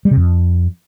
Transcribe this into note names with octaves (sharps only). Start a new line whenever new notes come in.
G3
C3
F2